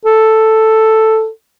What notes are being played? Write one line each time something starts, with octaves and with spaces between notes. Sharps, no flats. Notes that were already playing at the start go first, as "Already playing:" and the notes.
A4